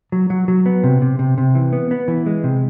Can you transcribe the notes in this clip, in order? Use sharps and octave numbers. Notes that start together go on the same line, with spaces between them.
F#3
F#3
F#3
B3
C3
C3
C3
C3
E3
B3
B3
E3
G#3
C3